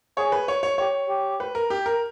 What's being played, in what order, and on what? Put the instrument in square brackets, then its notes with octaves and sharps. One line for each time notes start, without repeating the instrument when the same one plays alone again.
[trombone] G#4 [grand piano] C#5
[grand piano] B4
C#5
C#5
[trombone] G4 [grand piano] C#5
[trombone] G4
[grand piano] B4
A#4
G4
A#4